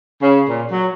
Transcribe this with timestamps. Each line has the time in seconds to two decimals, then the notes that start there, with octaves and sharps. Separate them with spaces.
0.22 C#3
0.47 A#2
0.69 F#3